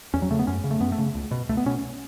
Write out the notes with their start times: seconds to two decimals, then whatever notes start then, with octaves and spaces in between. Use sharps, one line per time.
0.14 E2 C#4
0.22 F#3
0.31 C#3 A3
0.39 B3
0.47 F#2 C#4
0.64 C#3
0.71 A3
0.80 F#2 B3
0.92 A3
0.98 C#3
1.15 C#2
1.31 B2
1.49 C#2 A3
1.57 B3
1.66 B2 C#4